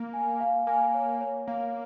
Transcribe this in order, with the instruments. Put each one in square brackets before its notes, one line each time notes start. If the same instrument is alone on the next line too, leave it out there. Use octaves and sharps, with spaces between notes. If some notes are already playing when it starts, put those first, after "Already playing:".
Already playing: [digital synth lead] A#3
[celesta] G#5
F5
[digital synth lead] A#3 [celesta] G#5
[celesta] C#5
C#5
[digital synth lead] A#3 [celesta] F5